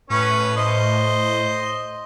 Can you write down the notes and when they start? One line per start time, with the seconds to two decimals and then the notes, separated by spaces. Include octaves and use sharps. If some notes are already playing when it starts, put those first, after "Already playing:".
0.10 A2 C#4 B4 C#5
0.56 C5 D#5